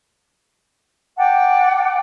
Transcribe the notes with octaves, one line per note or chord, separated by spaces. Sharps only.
F#5 G5 A5 D6